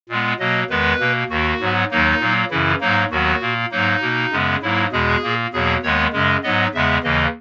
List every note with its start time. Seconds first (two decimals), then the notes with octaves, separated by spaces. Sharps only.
0.09 A#2 G#3 B3
0.39 B2 F#3 A#3 D#5
0.70 E2 D#3 G#3 B3 B4
1.00 B2 A#3
1.29 D#2 D#3 A#3 F#4
1.60 G#2 F#3 B3
1.91 D#2 D#3 F#3 A#3 D#4
2.20 A#2 F#3 A#3
2.51 F#2 C#3 E3 E4
2.80 G#2 F#3 A#3 D#4
3.10 D#2 D#3 F#3 B3 F#4
3.41 A#2 A#3
3.71 G#2 F#3 A#3 D#4
4.02 B2 A#3
4.31 F#2 C#3 G#3 B3
4.62 G#2 F#3 A#3 E4
4.92 E2 B2 G#3 G#4
5.23 A#2 A#3
5.53 E2 B2 F#3 A#3 G#4
5.83 D#2 D#3 G#3 B3 C#5
6.13 F#2 C#3 G#3 D#5
6.43 G#2 F#3 B3 D#5
6.74 E2 C#3 G#3 B3 E5
7.04 D#2 C#3 E3 A#3 D#5